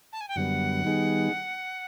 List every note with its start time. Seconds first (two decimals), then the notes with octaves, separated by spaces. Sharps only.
0.13 A5
0.21 G#5
0.28 G5
0.36 F#2 D3 G3 B3 F#5
0.84 D#3 G3 B3 D#4 G#4